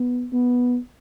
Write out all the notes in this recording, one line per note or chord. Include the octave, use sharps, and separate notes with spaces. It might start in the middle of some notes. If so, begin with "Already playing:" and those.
Already playing: B3
B3